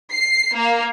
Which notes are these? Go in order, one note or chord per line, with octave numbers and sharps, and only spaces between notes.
C7
A#3